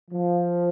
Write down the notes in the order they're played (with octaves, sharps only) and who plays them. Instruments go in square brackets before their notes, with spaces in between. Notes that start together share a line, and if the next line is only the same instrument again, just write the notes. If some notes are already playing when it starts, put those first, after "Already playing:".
[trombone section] F3